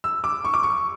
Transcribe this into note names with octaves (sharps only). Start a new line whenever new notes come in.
E6
D6
C#6
D6
C#6